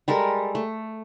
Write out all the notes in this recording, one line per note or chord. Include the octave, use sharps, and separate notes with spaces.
G3 G#3 A4 A#4
A3